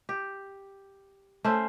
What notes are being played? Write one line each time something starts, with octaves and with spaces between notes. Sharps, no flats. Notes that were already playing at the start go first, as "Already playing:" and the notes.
G4
A3 C#4 C5 E5